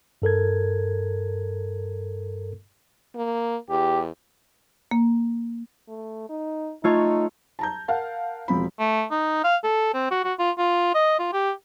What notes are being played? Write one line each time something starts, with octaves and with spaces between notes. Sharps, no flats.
G2 A4 A#4 G#6
A#3
E2 G4
A#3
A3
D#4
A3 D#4 F4 C#5
A5 A#5 G6
A#4 F5 F#5 A5
E1 F3 C4 B5
A3
D#4
F5
A4
C4
F#4
F#4
F4
F4
D#5
F4
G4